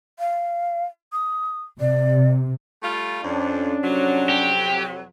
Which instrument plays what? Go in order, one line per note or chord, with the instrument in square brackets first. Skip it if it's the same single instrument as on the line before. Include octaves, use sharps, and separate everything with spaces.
[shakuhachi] F5
D#6
[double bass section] C3 [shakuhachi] D5
[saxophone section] G3 A3 F4
[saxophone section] F2 [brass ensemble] C#4 D4
[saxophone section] F2 C3 F#3
[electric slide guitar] G4